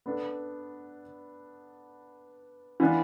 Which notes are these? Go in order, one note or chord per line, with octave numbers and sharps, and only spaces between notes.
B3 D4 A4
E3 B3 D4 F4 B4